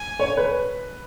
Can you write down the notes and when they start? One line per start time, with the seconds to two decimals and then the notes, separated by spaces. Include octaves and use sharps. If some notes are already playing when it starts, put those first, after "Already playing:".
Already playing: G#5
0.20 C#5
0.37 B4